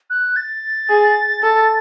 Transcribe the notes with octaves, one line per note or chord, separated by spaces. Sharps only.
F#6
A6
G#4
A4